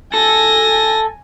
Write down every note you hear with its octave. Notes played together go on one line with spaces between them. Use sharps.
A4 G#5 A#6